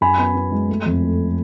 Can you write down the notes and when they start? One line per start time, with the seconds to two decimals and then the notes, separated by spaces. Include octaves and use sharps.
0.01 F#2 G#5 B5
0.19 B3
0.35 B3
0.52 G#3
0.69 A3
0.86 F2
1.03 A3